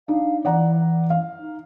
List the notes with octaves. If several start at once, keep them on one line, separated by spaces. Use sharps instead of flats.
D4 D#4 F5
E3 D5 F#5 A#5
F5
D#4